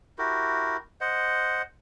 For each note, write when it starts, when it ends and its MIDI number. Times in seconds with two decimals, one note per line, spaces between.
0.18 0.77 64
0.18 0.77 66
0.18 0.77 67
0.18 0.77 70
1.01 1.62 72
1.01 1.62 75
1.01 1.62 78